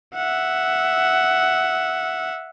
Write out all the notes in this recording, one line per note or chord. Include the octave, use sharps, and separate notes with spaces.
E5 F#5